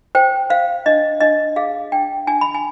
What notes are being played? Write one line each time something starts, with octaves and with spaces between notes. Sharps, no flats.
C5 G5
C5 F5
D4 D#5
D4 D#5
G#4 F5
D4 G5
D4 G#5
B5
G#5